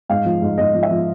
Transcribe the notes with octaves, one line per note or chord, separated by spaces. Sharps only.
G#2 F5
F3
G#2
G#2 D#5
F3
E5
F3